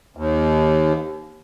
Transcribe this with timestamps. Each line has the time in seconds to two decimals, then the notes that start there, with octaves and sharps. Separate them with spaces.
0.17 D#2